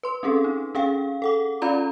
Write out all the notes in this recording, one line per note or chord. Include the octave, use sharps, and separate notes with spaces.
B4 C6
C4 C#4 G#4 A4
D#4
C#4 G#4 F5 G5
A4 F#5 D6
C#4 F4 D5 F5 A#5 B5